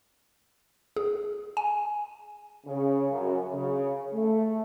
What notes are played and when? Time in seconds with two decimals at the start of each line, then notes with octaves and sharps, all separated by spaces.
0.97 G#4
1.57 G#5
2.66 C#3
3.10 F#2
3.53 C#3
4.12 A3